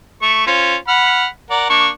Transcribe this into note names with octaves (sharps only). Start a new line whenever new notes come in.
A3 C#6
C#4 F4 C5
F#5 B5 F6
A#4 D5 F#5
A#3 D4 C#6